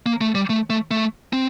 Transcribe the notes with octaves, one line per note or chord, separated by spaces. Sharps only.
A#3
A3
G3
A3
A3
A3
C4